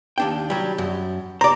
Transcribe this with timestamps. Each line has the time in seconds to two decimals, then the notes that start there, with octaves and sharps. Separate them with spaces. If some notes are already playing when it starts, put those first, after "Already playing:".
0.18 D#2 D4 G5
0.50 F#3 G3
0.78 F#2
1.41 C5 D5 A#5